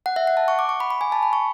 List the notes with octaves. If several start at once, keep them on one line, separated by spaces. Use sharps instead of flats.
F#5
E5
F#5
A5
C#6
D6
C#6
B5
B5
G#5
A5
B5
C#6